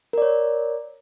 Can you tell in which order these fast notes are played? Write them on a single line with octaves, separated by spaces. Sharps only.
A#4 D5 C#5